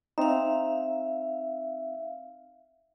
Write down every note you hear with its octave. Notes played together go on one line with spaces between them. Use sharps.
C4 D#4 E5 F5